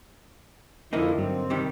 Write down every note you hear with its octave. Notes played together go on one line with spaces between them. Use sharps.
F2 D3 F3 A#3 D#4 E4
G2 F#3 C4
C3 D#3 G3